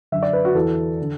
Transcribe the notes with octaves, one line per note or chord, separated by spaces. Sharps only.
F#2 D3 E5
D5
B4
F#4
E2 E3 A4
D3